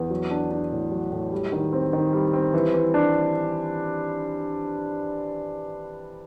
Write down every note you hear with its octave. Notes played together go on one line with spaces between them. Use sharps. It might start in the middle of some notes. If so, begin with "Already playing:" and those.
Already playing: E2
F#3
D4
D4
A2
F#3
A2
G3
D#3
C4
D#3
G3
C4
E3
E3
D4